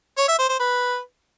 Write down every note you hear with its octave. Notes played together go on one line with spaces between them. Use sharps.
C#5
E5
C5
C5
B4